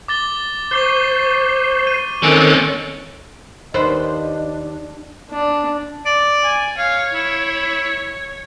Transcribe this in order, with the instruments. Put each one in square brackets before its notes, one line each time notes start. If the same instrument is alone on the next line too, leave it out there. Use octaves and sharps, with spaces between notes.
[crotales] D6 A6 G7
[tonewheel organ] C5 [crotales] C#6 D6 G7
[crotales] D#7
[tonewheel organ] D#3 A4 F#6 [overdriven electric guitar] C4 C#4 [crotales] D7
[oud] D#2 B4 C5 [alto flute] D4 [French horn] D#5
[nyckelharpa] D4
[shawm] D5
[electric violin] G#5
[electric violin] C#5 [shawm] F5
[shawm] E4